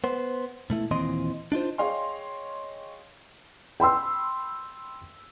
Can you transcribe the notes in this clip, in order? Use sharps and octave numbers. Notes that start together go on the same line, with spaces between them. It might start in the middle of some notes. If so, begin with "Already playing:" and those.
B3 C5
B2 A3 E4
D#2 A#2 E3 C4 D#5 C6
D4 D#4 F4 C5
G#4 C#5 D#5 F5 G5 C6
G5 B5 C6 E6